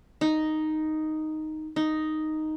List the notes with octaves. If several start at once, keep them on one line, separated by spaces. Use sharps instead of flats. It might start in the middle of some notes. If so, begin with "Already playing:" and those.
D#4
D#4